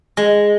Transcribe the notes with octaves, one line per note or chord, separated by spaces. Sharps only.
G#3